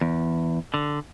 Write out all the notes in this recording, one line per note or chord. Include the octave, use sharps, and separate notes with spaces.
E2
D3